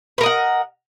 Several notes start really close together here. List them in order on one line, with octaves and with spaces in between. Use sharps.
B4 A#4 D#5 F#5